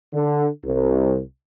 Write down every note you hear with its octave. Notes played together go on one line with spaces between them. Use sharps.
D3
C2